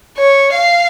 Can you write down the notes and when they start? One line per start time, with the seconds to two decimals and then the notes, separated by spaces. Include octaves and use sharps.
0.17 C#5
0.54 F5